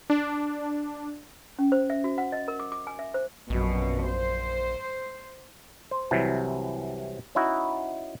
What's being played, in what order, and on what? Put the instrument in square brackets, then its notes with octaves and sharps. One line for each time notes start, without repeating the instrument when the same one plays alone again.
[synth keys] D4
[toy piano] C#4
C5
E5
F#4
F#5
D#5
A#4
D6
D6
G#5
E5
C5
[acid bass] A#1 [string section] F#2 B2
[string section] C5
[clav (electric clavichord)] C5
C2 C3 E3 F#3
C#4 D#4 E4 F#4